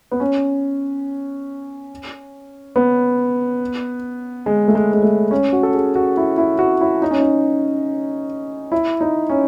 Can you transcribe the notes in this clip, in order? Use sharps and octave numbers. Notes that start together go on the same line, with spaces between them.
B3
C#4
B3
G#3
A3
G#3
G#3
A3
C#4
F#4
A4
G#4
F#4
E4
E4
F#4
E4
D#4
C#4
D#4
E4
D#4
C#4